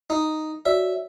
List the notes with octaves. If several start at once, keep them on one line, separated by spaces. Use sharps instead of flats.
D#4
F#4 C#5 D5 E5